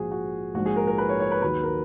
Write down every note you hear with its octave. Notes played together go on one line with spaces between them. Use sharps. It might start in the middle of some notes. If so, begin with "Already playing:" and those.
Already playing: A#1 G#2 F3 F#4 G#4
F#4
A#1 G#2 F3 G#3 F#4
G#4
A#4
A#4
B4
C#5
C#5
B4
D#2 D#3 F#3 B4
A#4